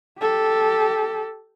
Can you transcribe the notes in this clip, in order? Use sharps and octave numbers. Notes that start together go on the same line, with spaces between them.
G4 A4